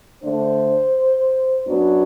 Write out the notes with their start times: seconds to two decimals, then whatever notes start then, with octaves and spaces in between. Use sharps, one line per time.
0.22 D3 A3 D4 C5
1.66 F#2 F#3 B3 D4